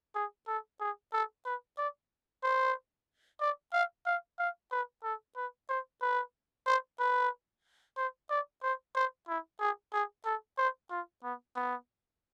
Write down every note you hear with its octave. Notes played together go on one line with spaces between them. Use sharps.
G#4
A4
G#4
A4
B4
D5
C5
D5
F5
F5
F5
B4
A4
B4
C5
B4
C5
B4
C5
D5
C5
C5
E4
G#4
G#4
A4
C5
F4
B3
B3